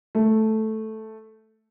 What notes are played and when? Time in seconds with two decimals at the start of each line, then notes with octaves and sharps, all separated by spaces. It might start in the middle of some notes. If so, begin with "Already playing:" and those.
0.15 A3